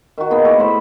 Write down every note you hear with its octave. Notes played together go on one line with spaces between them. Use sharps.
D#3 F#4
A#3 B3 D#4 G#4
A3 E4 G#4 D5
A2 C5 B5